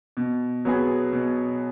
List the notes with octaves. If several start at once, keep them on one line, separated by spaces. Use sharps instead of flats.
B2
F#3 B3 G#4
B2